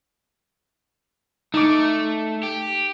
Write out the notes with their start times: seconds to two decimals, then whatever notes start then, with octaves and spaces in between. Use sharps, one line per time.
1.54 A3 D#4 D6
2.43 G4